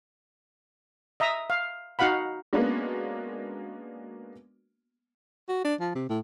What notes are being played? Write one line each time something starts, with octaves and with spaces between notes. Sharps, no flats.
D#5 E5 A#5 D#6
F5
D#4 F#4 F5 F#5 B5
G#3 A#3 B3 C#4 D4 F#4
F#4
D4
F3
C3
A2